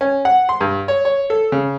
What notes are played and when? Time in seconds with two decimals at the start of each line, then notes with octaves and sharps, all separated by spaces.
0.01 C#4
0.25 F#5
0.49 C6
0.61 G2
0.88 C#5
1.05 C#5
1.30 A4
1.52 C#3